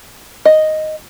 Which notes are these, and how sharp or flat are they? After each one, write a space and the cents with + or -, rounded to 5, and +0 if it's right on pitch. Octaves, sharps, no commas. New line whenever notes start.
D#5 +0